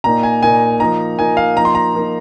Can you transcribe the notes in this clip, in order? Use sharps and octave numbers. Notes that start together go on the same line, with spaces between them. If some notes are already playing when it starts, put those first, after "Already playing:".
A#2 A#3 D#4 A#5
G#5
A#2 A#3 D#4 G#5
F3 A#3 D#4 A#5
F3 A#3 D#4 G#5
F5
F3 A#3 D#4 A#5
C6
A#5
F3 A#3 D#4